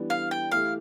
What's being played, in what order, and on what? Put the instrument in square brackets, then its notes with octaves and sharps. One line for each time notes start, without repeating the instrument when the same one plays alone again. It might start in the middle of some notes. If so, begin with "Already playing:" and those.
Already playing: [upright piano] E3 G3 B3 D4
[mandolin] F5
G5
[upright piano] E3 A3 E4 G4 [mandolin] F5